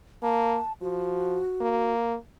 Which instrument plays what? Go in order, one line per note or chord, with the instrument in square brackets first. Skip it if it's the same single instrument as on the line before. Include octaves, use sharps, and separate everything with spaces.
[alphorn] A#3 [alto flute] A5
[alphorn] F3 [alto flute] F#4
[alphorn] A#3